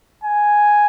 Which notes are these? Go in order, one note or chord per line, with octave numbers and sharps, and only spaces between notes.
G#5